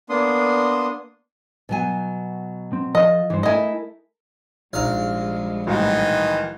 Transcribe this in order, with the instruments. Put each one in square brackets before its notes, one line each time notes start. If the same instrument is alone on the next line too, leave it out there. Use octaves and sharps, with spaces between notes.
[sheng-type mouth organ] A#3 B3 D4 C6 D#6
[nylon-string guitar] B2 F#3 G#5
[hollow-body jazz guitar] C4
[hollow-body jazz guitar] F3 A4 [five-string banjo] D#5
[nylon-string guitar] G2 [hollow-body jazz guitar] E3 C5
[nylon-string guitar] A3 E4 [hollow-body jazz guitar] A4 A#4 [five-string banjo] D#5 G#5
[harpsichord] A#1 F5 [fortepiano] G#2 A#5 F6 [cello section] F3 G3 G#3
[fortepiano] C2 A2 F#3 [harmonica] D#3 E3